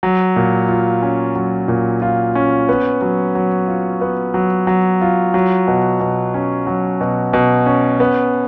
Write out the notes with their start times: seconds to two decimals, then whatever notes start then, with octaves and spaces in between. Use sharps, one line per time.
0.03 F#3
0.36 A#2
0.68 F4
1.02 C#4
1.36 F#3
1.68 A#2
2.02 F4
2.35 C#4
2.69 B3
3.02 F#3
3.35 F#3
3.67 F4
4.01 B3
4.34 F#3
4.67 F#3
5.01 F4
5.34 F#3
5.68 B2
6.00 B2
6.34 C#4
6.67 F#3
7.01 B2
7.33 B2
7.66 C#4
8.00 B3